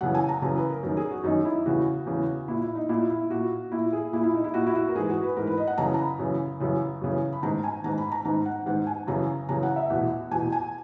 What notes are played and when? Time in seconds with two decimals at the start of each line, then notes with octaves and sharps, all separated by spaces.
0.01 F#2 C#3 E3 F#5
0.15 G#5
0.29 A#5
0.42 F#2 C#3 E3 A#5
0.55 B4
0.69 A#4
0.83 F#2 D#3 A#4
0.97 G#4
1.10 F#4
1.24 F#2 D#3 D#4
1.45 E4
1.65 E2 C#3 E3 F#4
2.06 E2 C#3 E3
2.48 A#2 E4
2.61 E4
2.75 D#4
2.89 A#2 E4
3.10 E4
3.30 A#2 F#4
3.72 A#2 E4
3.93 G#4
4.13 A#2 E4
4.23 E4
4.34 D#4
4.44 E4
4.54 A#2 F#4
4.67 E4
4.75 F#4
4.88 A#4
4.95 G#2 E3 G#4
5.09 F#4
5.23 B4
5.37 G#2 E3 A#4
5.47 B4
5.58 D#5
5.67 F#5
5.77 F#2 C#3 E3 A#5
5.94 A#5
5.98 B5
6.19 F#2 C#3 E3
6.60 F#2 C#3 E3
7.01 F#2 C#3 E3
7.33 B5
7.43 G#2 D#3 A#5
7.64 G#5
7.84 G#2 D#3 A#5
7.98 B5
8.12 A#5
8.25 G#2 D#3 A#5
8.46 F#5
8.66 G#2 D#3 F#5
8.87 G#5
9.07 F#2 C#3 E3 A#5
9.49 F#2 C#3 E3 A#5
9.63 F#5
9.76 E5
9.90 E2 B2 F#5
10.31 E2 B2 G#5
10.52 G#5